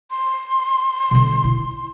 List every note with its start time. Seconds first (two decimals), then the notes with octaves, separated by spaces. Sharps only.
0.11 C6
1.11 B2 D3
1.44 E4